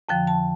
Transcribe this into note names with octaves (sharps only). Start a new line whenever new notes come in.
F2 D3 F3 G5
A5